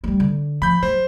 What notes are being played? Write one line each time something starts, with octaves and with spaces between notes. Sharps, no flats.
G3 G#3
D3
F3 B5 G6
F#3 C5